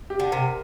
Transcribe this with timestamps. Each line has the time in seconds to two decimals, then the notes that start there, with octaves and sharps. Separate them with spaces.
0.10 G4
0.19 D3
0.31 C3 A#4